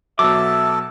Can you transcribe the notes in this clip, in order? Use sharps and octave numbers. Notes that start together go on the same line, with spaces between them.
B2 F#3 A4 E5 A5 D6